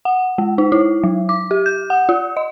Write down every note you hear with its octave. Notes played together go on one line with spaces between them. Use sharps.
F#5
G#3
D#4
E4
F#3
D6
G4
G6
F#5
F4
D#5